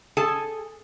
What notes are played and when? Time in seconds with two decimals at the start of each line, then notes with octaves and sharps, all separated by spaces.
0.17 G#4 A4 G#5 A5